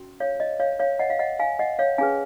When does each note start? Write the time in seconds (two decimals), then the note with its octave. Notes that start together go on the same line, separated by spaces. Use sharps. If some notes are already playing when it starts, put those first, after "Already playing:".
Already playing: C#4 F#4
0.20 C#5 F5
0.40 D#5
0.60 C#5 F5
0.79 C#5 F5
0.99 D#5 F#5
1.10 F5
1.19 D#5 F#5
1.39 F5 G#5
1.59 D#5 F#5
1.79 C#5 F5
1.98 C#4 G#4 B4 F5 G#5